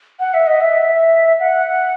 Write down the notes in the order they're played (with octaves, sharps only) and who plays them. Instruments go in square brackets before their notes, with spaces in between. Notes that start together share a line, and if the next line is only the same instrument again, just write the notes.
[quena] F#5
E5
D#5
E5
F#5